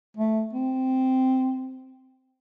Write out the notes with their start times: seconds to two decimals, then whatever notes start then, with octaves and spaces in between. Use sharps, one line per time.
0.17 A3
0.53 C4